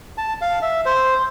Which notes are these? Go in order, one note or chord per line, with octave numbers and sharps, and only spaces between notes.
A5
F5
E5
C5